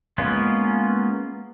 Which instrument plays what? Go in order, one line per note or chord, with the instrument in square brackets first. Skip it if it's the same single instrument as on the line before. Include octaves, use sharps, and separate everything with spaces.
[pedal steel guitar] G#3 A#3 B3 C#4 F4